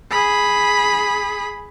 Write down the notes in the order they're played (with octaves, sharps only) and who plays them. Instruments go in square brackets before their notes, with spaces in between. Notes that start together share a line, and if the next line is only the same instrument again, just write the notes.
[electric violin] G#4 B5